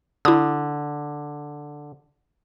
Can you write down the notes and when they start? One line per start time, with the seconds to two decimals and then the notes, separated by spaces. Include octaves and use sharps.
0.25 D3 E4 D#6